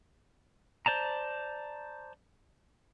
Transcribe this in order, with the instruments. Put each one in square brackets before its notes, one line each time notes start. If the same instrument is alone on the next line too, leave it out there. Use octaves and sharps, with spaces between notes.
[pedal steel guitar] C5 D5 A5 A#5